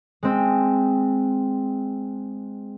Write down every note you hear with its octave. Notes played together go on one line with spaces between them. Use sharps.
G#3 C4